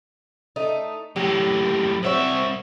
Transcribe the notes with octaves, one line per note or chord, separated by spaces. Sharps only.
A3 D#4
F#2 A2 G4
C2 C4 F#4 C#5 E5